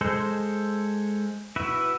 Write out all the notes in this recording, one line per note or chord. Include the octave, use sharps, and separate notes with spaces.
G#3 A4 C5
E4 F#4 B4 E5